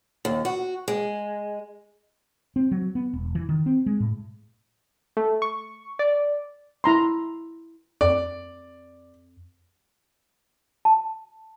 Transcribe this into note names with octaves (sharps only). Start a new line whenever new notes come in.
D#2
F#4
G#3
C4
F#3
B3
E1
E3
D#3
C4
G#3
A2
A3
C#6
D5
E4 A#5 C6
F2 D5
A5